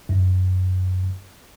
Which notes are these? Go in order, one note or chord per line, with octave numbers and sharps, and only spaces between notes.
F#2